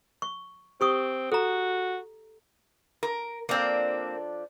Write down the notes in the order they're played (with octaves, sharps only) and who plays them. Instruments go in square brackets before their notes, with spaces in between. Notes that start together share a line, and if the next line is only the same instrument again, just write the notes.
[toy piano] C#6
[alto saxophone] C4 [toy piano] G4 C#6 D#6
[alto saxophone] F#4 [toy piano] A4 A#5
[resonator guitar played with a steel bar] A#4
[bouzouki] F3 D4 A4 [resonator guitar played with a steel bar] A#3 C4